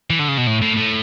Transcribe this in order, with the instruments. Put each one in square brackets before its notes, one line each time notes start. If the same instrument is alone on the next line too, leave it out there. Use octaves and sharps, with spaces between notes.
[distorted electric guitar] E3
D3
C#3
B2
A2
A2
A2